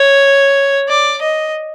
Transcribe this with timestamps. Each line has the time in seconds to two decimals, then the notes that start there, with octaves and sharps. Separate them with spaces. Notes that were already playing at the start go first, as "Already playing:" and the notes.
Already playing: C#5
0.88 D5
1.22 D#5